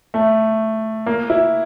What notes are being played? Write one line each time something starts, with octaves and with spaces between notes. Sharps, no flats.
A3
A#3
E4